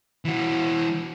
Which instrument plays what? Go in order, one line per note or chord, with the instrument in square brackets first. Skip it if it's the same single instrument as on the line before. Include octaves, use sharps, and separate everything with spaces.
[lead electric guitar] E3 F#4